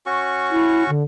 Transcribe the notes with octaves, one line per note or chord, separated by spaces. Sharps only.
C#4 F#4 C#6
E4
D3